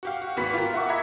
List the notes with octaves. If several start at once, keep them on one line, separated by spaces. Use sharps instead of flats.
F#4 G4 F5
F#4
G#1 G#2 B3 F#4 B5 B6
F4 G4 A#4
E5 F#5 C#6 D6
D#5 E5 A#5 B5 G#6 B6